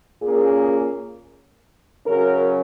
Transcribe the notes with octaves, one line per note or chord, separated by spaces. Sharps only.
A#2 A#3 C#4 G#4
F#2 C#3 F#3 C#4 A#4